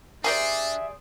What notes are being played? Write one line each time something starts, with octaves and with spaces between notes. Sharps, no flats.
G3 D4 G#4 A#4 C5 D5 E5 G#5